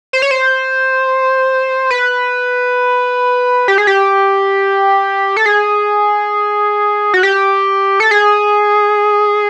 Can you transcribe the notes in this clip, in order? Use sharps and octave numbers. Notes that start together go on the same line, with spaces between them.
C5
C#5
C5
B4
G4
G#4
G4
A4
G#4
F#4
G4
A4
G#4